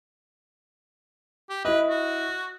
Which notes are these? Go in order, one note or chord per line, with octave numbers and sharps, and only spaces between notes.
G4
E4 B4 D#5
F#4